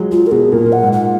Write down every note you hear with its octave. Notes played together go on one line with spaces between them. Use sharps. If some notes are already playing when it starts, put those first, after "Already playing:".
Already playing: F3 F#3 G#3
G#3 F4
A#4
B2 G#4
A#2 A#4
F#5
G#2
F#5